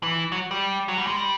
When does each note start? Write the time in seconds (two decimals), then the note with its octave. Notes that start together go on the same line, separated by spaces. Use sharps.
0.03 E3
0.32 F#3
0.51 G3
0.88 F#3
0.98 G3
1.07 G#3
1.16 G3